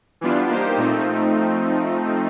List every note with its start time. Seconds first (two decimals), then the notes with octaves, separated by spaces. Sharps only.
0.21 E3 G3 B3 D4 F4
0.49 A#3 D#4 G4 C5
0.77 A#2 F3 A3 C4 D#4